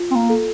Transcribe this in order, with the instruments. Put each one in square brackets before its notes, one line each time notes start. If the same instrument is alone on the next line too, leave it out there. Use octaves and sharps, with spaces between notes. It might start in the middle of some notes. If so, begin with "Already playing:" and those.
Already playing: [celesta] F4
[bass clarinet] C4
A#3
[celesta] A4